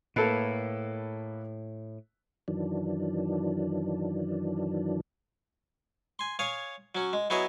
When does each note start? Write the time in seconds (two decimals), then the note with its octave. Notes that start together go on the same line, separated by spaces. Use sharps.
0.16 A2 A#3 A4 B4
2.48 F#2 D#3 E3 F#3 D4
6.19 G#5 C6
6.39 C#5 F5 G#5 D#6
6.95 F#3 C#4
7.13 G#3
7.30 F#3 B3 E4 G#4 C#5 D#5